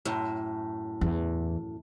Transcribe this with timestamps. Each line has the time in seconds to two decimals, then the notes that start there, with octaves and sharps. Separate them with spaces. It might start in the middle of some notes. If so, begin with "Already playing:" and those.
0.05 F#2 A2
1.01 E2